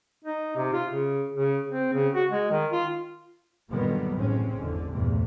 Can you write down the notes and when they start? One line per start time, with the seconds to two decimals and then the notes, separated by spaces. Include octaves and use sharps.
0.24 D#4
0.56 C3
0.73 F4
0.90 C#3
1.35 C#3
1.71 C4
1.93 C#3
2.15 F#4
2.31 G#3
2.51 D#3
2.72 F4
3.69 A#2 D3 D#3 F#3 G3 B3
4.14 A1 A2 C3 G#3 C4 C#4
4.57 G#1 E2 D3
4.91 A#1 E2 G2 C3 A3